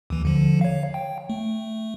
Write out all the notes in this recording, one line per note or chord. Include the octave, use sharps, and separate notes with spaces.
D#2 E3
D3 F3
C#5 F5
G5
A3